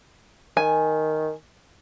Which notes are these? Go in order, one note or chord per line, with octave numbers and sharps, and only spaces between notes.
D#3 G#5